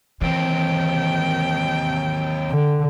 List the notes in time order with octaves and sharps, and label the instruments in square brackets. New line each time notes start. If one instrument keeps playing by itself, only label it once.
[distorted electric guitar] D#2 C4 [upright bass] E3 [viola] G5
[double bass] D3